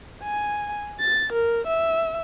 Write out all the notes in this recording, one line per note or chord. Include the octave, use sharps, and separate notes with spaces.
G#5
A6
A#4
E5